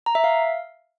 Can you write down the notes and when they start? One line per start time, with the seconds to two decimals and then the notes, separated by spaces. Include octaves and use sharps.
0.06 A#5
0.15 E5
0.24 F5